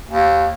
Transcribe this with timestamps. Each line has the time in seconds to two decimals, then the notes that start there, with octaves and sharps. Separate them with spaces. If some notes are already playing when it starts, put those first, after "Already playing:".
0.08 D#2